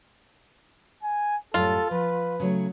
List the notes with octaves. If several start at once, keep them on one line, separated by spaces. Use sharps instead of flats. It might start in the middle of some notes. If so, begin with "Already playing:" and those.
G#5
F#2 A2 G3 F4 A4
F3 B4
C#3 F#3 A3